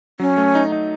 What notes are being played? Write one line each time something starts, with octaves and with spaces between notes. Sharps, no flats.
F#3 C#4
A3
D#4
D#4